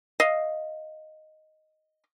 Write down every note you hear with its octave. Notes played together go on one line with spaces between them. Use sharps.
D#5 F5